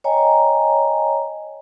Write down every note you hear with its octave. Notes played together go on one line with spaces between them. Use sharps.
C#5 D#5 G5 G#5 A#5